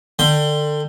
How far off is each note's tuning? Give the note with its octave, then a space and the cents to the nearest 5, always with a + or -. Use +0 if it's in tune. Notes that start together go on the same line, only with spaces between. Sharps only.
D3 +25 G5 +0